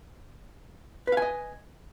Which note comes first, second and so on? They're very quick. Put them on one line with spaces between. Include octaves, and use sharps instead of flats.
B4 F5 G#5 D#5